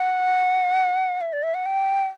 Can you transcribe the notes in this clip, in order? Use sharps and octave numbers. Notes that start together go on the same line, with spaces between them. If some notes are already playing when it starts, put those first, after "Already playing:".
Already playing: F#5
E5
D5
E5
F#5
G5